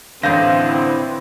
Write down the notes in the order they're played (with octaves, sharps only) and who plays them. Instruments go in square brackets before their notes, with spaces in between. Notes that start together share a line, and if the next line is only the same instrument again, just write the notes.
[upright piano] A1 G6 A#6 [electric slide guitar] D3 [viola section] C4 E4 B4 [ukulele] F5